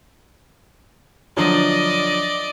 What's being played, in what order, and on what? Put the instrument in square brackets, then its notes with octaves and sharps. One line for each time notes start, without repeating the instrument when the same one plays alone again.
[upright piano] D3 F3 F#3 [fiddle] D5 D#5